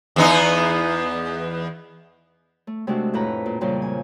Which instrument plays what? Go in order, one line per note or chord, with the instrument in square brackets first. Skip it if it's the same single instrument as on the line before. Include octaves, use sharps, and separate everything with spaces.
[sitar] E2 B3 D#4
[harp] A3
C3 G#3 A3 D4 F#4
F2 A2 B4 A#5
A#2
F2 A#2 C#3 F3 G3
G#5